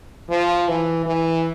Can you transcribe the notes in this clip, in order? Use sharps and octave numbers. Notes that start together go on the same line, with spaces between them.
F3
E3
E3